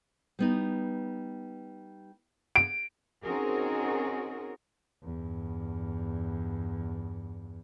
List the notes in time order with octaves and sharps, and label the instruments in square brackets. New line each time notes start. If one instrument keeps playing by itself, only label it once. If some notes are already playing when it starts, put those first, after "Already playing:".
[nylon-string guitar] G3 B3 D#4
[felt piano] D7
[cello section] C4 C#4 D#4 F#4 G#4 A#4
[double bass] E2 G2